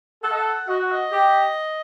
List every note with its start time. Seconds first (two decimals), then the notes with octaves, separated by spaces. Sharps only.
0.23 A4 F#5
0.31 D#5
0.39 F#5
0.68 F#4 D#5
0.79 F#5
0.91 D#5
1.11 G4